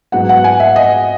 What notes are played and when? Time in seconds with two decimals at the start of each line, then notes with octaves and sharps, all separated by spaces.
0.12 G#2 F#3 B3 F#5
0.29 F#5
0.44 G#5
0.60 E5
0.76 D#5